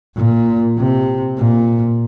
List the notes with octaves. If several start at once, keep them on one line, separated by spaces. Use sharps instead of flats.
A#2
C3
A#2